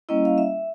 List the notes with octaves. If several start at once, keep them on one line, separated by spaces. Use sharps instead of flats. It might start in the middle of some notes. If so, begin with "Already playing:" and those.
G3 A#3 C#4 E4 D#5
F5
E5